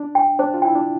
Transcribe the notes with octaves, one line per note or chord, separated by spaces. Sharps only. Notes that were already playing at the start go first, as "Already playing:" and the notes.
Already playing: D4
G5
D4 C5
F4
E4 G5
D4